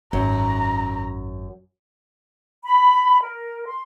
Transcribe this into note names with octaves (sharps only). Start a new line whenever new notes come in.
G#1 F#2 A#5
B5
A#4
C6